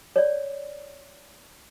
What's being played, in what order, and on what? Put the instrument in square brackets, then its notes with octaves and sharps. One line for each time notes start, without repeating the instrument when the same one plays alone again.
[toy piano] C#5 D5